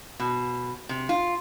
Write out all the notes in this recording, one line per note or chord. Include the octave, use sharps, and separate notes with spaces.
B2
C3
F4